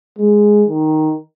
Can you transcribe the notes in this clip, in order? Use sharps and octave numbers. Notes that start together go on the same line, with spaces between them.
G#3
D#3